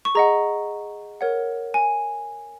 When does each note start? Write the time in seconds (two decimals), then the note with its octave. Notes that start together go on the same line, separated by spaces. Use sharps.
0.05 C#6
0.15 G#4 D#5 F#5 A#5
1.21 A#4 C#5 F#5
1.74 G#5